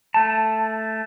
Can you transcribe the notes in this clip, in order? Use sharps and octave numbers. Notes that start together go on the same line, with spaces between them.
A3 A5